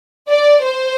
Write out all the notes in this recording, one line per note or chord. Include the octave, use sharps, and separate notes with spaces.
D5
C5